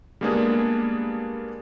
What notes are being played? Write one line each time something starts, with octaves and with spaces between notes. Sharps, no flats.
G3 G#3 A#3 B3 D4 G#4